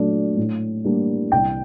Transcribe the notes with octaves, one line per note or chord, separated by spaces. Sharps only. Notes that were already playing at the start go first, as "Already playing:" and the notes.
Already playing: A#2 F#3 A3 D4
A2
G3 A#3 D4
C2 G5